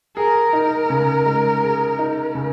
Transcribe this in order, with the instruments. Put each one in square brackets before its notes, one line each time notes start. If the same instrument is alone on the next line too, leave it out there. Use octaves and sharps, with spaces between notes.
[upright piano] G#4 [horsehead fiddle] A#4
[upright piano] D#4
C#3
G#3
G#4
D#4
C#3